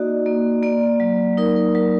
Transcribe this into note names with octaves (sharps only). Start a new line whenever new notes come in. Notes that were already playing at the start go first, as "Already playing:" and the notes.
Already playing: A#3 D#4 F#4 D5 D#5
A#3
A#3 D5
F#3
D#4 A#4
A#4
F#3 A#4